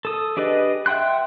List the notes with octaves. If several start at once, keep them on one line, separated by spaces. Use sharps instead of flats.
A4 D#6
D4 G4 G#4 B4 D#5
E5 F#5 G5 C6 F#6